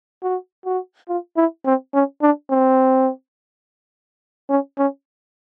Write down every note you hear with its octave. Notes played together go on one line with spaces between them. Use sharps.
F#4
F#4
F4
E4
C4
C#4
D4
C4
C#4
C#4